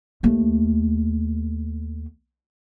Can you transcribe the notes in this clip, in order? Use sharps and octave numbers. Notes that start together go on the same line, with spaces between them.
D#2 A3